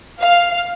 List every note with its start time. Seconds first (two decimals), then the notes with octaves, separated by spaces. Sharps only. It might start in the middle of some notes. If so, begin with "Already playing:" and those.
0.21 F5